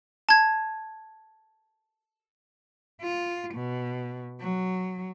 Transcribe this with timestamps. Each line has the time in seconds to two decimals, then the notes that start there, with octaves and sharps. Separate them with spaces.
0.29 A5 G#6
3.02 F4
3.54 B2
4.41 F#3